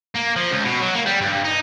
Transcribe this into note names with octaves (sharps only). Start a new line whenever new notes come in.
A#3
F3
C#2
B2
F#3
A#3
G3
G2
D#4